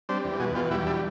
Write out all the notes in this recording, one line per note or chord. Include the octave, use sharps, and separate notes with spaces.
G3 C4 D4
E2
B2 F#4 G#4
E2 F4 G4
G3 E4 F#4
D4 E4